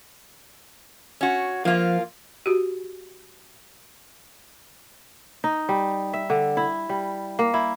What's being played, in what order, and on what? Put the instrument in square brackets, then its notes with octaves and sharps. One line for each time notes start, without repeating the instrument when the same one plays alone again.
[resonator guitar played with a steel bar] C#4 F#4
[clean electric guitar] F3 [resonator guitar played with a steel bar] A#3 F4
[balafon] F#4 G4
[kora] D#4
G3
E5
D3
E4
G3
A#3
E4